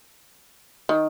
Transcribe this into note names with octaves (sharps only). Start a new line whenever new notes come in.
D#3